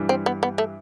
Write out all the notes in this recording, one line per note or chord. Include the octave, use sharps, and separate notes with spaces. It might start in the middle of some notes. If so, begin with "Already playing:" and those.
Already playing: G2 E3 G3
C4
B3
B3
A3